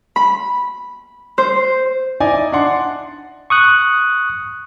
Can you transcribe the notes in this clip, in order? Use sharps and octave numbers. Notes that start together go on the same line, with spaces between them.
B5
C5
D#4 E4 D5 G#5
D4 D5 F#5 C6
C#6 D#6 F#6